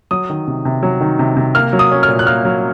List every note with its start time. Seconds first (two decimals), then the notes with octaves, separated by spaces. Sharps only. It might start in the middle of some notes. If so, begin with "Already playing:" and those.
0.11 F#3 D#6
0.30 D#3
0.48 C3
0.65 C3
0.83 F#3
1.01 D#3
1.19 C3
1.37 C3
1.55 A#3 F6
1.73 F#3
1.79 D#6
1.92 C#4
2.03 F6
2.09 A#2
2.19 F#6
2.26 A#3 F6
2.45 F#3